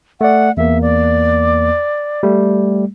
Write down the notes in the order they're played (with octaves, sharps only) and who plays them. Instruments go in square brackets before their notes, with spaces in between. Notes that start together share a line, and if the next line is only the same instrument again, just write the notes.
[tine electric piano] A3 D5 [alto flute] F#5
[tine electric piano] E2 A#3 [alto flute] E5
[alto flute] D5
[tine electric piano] G3 A3